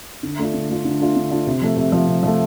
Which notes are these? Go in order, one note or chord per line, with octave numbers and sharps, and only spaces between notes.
D3
A3 D4 F4
D3
A3 D4 F4
D3
A3 D4 F4
D3
A3 D4 F4
C3
F3 A3
C3
F3 A3
C3
F3 A3